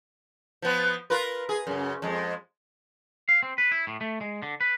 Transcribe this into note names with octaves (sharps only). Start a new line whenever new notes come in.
F3 B3
F4 A#4 B4
G#4
F#2 C#3
F2 G#3
F5
C4
B4
E4
A2
A3
G#3
D3
B4